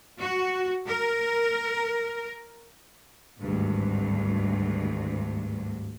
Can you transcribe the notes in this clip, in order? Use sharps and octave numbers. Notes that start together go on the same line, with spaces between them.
F#4
A#4
G#1 D2 G2